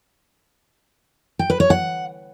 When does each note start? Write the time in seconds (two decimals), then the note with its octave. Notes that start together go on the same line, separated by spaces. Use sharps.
1.39 G5
1.50 B4
1.60 C#5
1.70 F#5